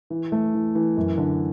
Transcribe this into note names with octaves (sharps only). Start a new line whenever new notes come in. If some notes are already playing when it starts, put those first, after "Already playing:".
E3
A3
E3
E3
F#2
D3